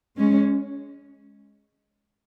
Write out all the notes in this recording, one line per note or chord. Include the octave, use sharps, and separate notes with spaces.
G#3 C#4